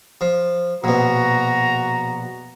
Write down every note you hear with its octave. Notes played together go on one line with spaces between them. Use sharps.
F3
A#1 B2 F#4 A#5